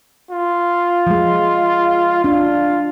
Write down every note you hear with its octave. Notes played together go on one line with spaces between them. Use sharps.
F4
F3 G#3
D4 F4